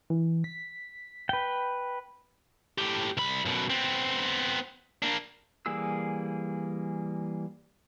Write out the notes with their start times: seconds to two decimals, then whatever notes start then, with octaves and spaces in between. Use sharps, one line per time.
0.10 E3
0.44 B6
1.29 B4 G5
2.78 A2 G4
3.17 C2 B5
3.45 F#2 B2
3.70 B3 C4
5.03 A#3 D4
5.66 E3 G3 A#3 G#4 E6